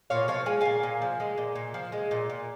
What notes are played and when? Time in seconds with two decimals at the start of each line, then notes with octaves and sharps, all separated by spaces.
0.10 A#2 C#5 F5
0.28 F3 C#5 F5
0.46 G#3 G#5
0.61 A#2 F5 G#5
0.83 A#2
1.02 F3
1.20 G#3
1.38 A#2
1.55 A#2
1.74 F3
1.92 G#3
2.11 A#2
2.30 A#2